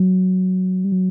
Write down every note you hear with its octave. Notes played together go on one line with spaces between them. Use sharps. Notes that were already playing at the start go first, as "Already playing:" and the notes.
Already playing: F#3
G3
F#3